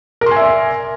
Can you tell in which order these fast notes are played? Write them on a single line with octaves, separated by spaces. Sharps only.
A#4 C6 G#5 E5 D5